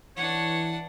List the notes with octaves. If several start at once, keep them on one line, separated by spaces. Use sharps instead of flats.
E3 D4 C#5 F#5